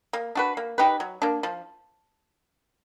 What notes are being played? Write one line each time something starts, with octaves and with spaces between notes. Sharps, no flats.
A#3
D4 F#4 B4
A#3
D#4 G4 B4
F#3
A#3 D4
F3